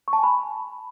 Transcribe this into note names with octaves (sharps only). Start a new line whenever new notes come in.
C#6
A5
G#5
B5